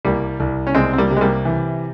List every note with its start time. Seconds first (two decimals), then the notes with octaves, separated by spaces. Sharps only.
0.05 C2 G3 A#3
0.40 C2
0.67 C#4
0.74 C2 G#3 C4
0.93 C4
0.98 G3 A#3
1.10 C3
1.17 G#3
1.21 G3 A#3
1.45 E3